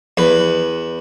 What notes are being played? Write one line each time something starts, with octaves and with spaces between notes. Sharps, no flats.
E2 B4